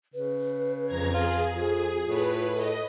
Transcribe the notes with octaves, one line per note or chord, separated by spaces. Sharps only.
C#3 B4
F2 A#5 G#6
F4 G#4
F2 F4
A2 F4 B4
A4 D#5